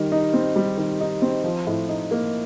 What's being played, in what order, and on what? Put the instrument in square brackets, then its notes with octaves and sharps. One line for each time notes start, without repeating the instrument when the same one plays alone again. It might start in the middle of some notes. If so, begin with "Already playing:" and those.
Already playing: [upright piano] D#3 G3
D#4
C4
G3
D#3
D#4
C4
F3
A2
D#4
A#3